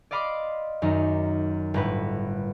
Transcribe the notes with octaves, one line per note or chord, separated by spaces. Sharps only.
D5 D#5 F5 B5 C6 D6
F#2 D#3 D#4
G1 A2 B4